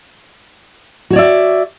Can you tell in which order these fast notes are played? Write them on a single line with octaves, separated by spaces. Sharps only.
F#4 C#5 D5 E5